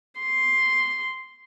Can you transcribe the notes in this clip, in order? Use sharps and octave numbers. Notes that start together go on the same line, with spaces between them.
C6